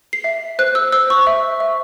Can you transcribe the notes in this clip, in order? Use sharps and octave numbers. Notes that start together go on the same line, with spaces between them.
C7
E5
C5 F#6
E6
C5 E6
C#6
E5
E5